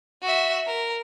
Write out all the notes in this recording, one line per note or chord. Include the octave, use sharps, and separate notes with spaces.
F#4 E5
A#4